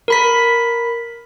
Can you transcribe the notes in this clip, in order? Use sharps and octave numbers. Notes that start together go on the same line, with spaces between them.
A#4 B5 B6